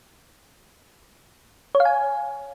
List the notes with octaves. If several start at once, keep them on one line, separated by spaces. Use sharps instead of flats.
C#5
F5
G#5